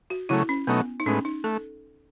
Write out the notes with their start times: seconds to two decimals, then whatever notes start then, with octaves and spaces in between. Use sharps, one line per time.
0.10 F#4
0.29 C#3 F#3 A3 E4
0.49 C#4
0.67 B2 F#3 A3 B3 D#4
1.00 D#4
1.06 A2 G#3 B3 C#4
1.25 D#4
1.44 A3 A4